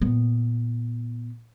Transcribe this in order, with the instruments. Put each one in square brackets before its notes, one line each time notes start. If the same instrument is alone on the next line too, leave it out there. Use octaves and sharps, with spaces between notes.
[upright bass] A#2 B3